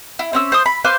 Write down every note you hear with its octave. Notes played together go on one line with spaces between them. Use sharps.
E4
C4 C#4 E6
C5 D#6
B5
B4 C5 F5 D6